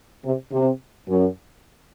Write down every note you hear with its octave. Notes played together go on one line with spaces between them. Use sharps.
C3
C3
F#2